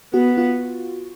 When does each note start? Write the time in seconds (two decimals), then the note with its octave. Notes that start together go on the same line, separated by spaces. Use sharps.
0.14 B3 F#4
0.37 F4